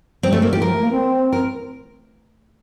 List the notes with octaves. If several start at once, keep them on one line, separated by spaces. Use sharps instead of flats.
G3 C4
A3
G3 A#3
E3 G4
F3 A#4
A3
A#3
C4
A#4